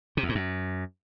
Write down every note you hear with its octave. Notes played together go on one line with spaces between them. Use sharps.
C3
E2
G#2
F#2